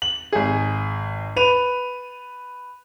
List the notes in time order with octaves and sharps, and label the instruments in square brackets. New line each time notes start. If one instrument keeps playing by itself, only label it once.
[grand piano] F#7
G#1 G#4
B4 D#7 F7